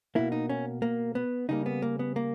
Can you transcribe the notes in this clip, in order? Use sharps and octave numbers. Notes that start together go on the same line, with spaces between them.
B2 A#3 E4
D#4
C#4
A#3
B3
C#3 G3 A#3 D#4
B3
A#3
B3
A#3